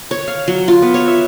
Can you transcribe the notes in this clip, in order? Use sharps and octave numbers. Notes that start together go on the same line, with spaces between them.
C#5
F5
F#3
F4
B3
C#5
E5